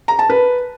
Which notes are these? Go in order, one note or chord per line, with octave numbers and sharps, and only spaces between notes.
A#5
A5
B4